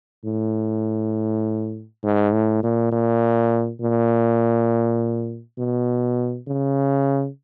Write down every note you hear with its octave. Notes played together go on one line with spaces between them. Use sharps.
A2
G#2
A2
A#2
A#2
A#2
B2
C#3